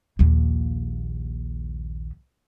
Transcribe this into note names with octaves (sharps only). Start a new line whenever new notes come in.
A#1 D#2